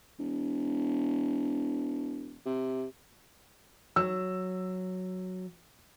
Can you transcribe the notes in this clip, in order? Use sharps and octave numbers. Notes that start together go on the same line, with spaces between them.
E1
C3
F#3 E6